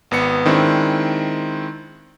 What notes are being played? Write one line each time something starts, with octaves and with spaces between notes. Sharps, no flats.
G#1 B3 C#7
D#3 G#3 C4 D4 E4